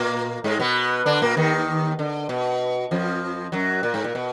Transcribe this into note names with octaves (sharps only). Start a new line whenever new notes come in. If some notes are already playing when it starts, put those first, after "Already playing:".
Already playing: A#2 A#3
G#2 G#3
B2 B3
D3 D4
A#2 A#3
D#2 D#3
D3
B2
F2 F3
F#2 F#3
A#2
G#2
A#2
B2